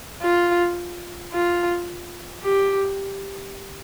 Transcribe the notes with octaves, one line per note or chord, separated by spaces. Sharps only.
F4
F4
G4